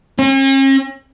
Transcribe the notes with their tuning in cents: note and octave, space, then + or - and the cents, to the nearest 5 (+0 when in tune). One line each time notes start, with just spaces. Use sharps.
C#4 -45